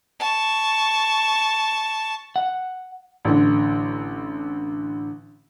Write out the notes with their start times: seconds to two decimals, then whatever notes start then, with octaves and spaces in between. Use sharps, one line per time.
0.20 A5 C#6
2.36 F#5
3.25 A1 D3